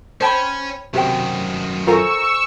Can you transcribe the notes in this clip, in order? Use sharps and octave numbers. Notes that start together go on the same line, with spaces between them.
C#4 C5 C#5 G5 A5 B5
F#2 C3 D#3 F#4 C5 G5
F4 A4 A#4 C5 G#5 A#5 C#6 E6